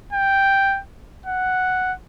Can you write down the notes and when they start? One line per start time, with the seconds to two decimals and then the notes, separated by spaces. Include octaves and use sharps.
0.13 G5
1.26 F#5